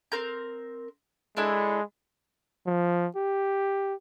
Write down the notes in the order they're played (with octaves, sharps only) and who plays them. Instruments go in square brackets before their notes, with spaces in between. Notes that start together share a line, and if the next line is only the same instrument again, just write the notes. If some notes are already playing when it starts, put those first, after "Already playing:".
[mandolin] C4 A#4 G6
[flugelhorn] G#3 [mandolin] D4 E4 A4
[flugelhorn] F3
G4